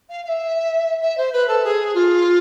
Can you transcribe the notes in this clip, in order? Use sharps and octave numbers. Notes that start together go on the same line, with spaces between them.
F5
F5
E5
E5
C5
B4
A4
G#4
F4